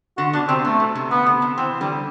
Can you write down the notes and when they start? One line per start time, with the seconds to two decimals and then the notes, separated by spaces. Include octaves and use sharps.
0.17 D3 F#4
0.33 B2 D4
0.48 C3 C4
0.65 B2 A3
0.80 B2
0.95 C3
1.11 D3 B3
1.26 C3
1.42 C3
1.57 E3 C4
1.81 D3 G3